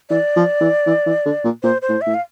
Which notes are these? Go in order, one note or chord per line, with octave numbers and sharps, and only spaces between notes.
E3 D5
F3
E3
E3
E3
D3
A#2
A#2 C5
C5
A2
E5
A2
F5